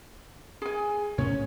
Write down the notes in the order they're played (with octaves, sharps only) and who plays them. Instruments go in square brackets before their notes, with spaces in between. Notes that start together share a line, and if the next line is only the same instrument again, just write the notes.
[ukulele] G#4 G#5
[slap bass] A2 C#4 [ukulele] C#5